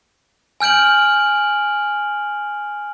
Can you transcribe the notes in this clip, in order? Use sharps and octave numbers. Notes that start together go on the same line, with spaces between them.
G#5 F6 G6 D7 F#7